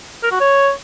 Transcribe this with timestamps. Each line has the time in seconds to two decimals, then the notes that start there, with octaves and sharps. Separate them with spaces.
0.23 A#4
0.32 F#4
0.40 C#5